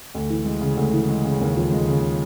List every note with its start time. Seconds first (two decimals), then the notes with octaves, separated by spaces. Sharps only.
0.15 D2
0.30 E3
0.45 G#3
0.61 C#3
0.77 D2
0.93 E3
1.08 G#3
1.25 C#3
1.41 D#2
1.57 F3
1.72 G#3
1.88 C#3